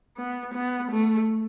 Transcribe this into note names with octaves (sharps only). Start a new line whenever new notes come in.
B3
B3
A3